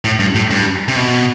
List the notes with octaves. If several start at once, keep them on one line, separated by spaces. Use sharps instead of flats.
A2
G2
A2
G2
C3
B2